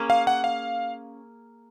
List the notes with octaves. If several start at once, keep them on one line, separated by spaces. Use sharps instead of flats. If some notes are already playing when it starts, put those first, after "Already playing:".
Already playing: A#3 C#4 G#4 C#5
F5
F#5
F5